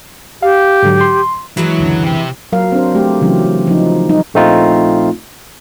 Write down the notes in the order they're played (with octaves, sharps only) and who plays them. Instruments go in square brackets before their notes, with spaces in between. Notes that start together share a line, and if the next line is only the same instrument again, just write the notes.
[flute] G4 [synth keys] F5
[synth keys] G#2 D3 F#3
C6
[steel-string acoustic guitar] E3 G#3 E4 [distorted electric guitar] F#3
[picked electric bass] C#2 F#2 D3
[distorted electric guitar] C3 G4
[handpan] F#3 A#4 F5
C4 D4 C5
A3 G4
C#3 E3 F#3 C#4
F3 D#4
G3 D#4
[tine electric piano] A#1 A3 C4 D#4 F4